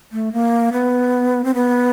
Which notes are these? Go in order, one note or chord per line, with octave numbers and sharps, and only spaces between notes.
A3
A#3
B3
C4
B3